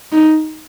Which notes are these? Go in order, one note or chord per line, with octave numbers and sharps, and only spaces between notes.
D#4